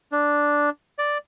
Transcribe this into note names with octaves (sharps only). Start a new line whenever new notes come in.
D4
D5